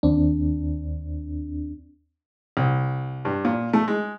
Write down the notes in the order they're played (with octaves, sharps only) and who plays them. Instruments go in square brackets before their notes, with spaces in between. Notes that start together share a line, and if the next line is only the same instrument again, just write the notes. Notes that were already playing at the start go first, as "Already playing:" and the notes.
[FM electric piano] D#2 C4 D4
[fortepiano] C2
G2
A#2
A3
G#3